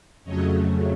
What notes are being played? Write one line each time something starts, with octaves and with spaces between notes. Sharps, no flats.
F2 C#3 F#3 A3 C#5 D#5